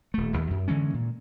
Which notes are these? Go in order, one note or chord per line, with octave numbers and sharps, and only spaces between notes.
D#1 A3
D#1 D#2
F#2
D3 E3 G#3 C#4
A#2